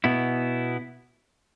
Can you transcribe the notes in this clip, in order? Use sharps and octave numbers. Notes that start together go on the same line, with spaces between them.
B2 B3 E4